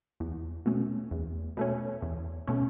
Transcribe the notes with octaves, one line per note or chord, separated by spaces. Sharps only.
E2
B2 A3 C#4
E2
B2 A3 C#4
E2
B2 A3 C#4